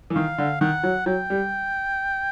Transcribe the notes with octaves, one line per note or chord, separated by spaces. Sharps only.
E3
D#3 F5
D3
D#3 F#5
F#3
F#3 G5
G3